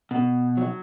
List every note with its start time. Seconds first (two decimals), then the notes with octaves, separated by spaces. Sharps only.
0.11 B2
0.57 F#3